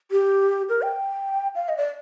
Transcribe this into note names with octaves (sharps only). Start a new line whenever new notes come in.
G4
A#4
G5
F5
D#5
D5